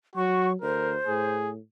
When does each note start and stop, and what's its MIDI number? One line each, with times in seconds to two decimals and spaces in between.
0.16 0.54 54
0.16 0.49 66
0.16 0.52 85
0.62 0.96 38
0.62 0.94 70
0.62 1.36 72
1.07 1.58 45
1.07 1.50 68